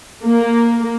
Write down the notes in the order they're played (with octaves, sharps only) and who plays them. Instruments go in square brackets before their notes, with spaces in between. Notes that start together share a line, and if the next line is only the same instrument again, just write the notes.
[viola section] A#3